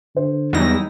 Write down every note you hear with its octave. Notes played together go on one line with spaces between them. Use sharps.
D3 C5
E2 F#3 G3 D#4 E4 A#6